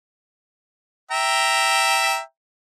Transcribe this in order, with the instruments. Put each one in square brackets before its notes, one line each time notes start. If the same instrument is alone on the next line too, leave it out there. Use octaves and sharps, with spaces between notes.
[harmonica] E5 G5 A#5